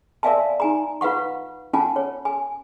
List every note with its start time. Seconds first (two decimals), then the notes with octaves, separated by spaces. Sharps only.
0.23 A#4 D5 E5 F5 G#5 A5
0.60 D#4 G#5 A#5
1.01 F4 B4 F5 F#5 C#6
1.73 C#4 F4 F#5 G#5 A5
1.96 C#5
2.25 G#5